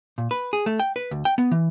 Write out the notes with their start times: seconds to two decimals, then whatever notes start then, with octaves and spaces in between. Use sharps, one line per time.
0.18 A#2
0.31 B4
0.53 G#4
0.66 A3
0.80 G5
0.96 B4
1.11 D2
1.25 G5
1.38 B3
1.51 E3